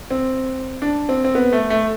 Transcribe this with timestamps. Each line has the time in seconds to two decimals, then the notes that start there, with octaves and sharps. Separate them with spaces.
0.10 C4
0.82 D4
1.09 C4
1.24 C4
1.35 B3
1.52 A3
1.70 A3